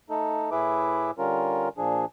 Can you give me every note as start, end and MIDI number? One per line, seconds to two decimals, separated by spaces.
0.10 0.50 57
0.10 0.50 63
0.10 0.50 69
0.51 1.11 45
0.51 1.11 64
0.51 1.11 68
0.51 1.11 71
0.51 1.11 76
0.51 1.11 86
1.18 1.69 50
1.18 1.69 55
1.18 1.69 61
1.18 1.69 65
1.18 1.69 70
1.78 2.05 46
1.78 2.05 53
1.78 2.05 62
1.78 2.05 68